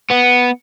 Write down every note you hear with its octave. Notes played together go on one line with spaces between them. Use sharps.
B3